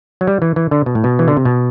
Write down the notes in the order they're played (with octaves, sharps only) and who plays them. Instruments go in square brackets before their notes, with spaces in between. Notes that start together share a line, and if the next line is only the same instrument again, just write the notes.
[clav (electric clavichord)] F#3
G3
E3
E3
D3
B2
A2
B2
E3
D3
C3
B2